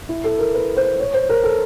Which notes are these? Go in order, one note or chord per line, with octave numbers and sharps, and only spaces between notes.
E4
A4
A#4
B4
C5
C#5
C5
A#4
A4